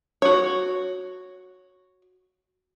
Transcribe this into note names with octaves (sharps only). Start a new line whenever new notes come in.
F#4 C#5